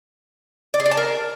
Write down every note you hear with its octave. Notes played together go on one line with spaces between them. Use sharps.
D5
G#4
D5
A5
A#4